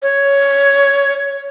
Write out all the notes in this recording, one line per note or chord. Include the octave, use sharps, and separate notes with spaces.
C#5